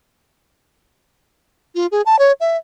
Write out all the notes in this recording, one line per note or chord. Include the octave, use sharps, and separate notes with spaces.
F4
G#4
A5
C#5
E5